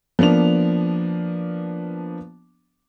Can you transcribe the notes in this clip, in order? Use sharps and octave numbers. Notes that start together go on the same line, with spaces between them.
F3 A#3 B3 D4 F7